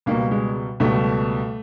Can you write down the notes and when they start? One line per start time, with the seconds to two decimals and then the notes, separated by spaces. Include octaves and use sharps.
0.06 C#2 B2 G3 A#3
0.31 G#3
0.80 C#2 B2 G3 A3